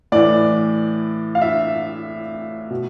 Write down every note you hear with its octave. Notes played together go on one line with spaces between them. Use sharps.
A2 E3 D5
F5
E5
B2